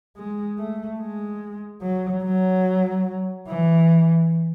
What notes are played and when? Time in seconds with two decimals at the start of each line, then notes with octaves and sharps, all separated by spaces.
0.16 G#3
0.58 A3
0.99 G#3
1.82 F#3
2.23 F#3
3.48 E3